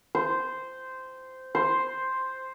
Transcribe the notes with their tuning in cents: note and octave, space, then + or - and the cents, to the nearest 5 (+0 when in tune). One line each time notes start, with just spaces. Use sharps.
C5 -10
C5 +0